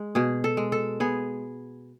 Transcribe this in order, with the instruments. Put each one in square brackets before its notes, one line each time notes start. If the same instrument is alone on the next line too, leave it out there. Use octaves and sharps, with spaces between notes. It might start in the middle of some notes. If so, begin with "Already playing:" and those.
Already playing: [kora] G#3
B2 G#4
A4
G#3
A4
B3 G#4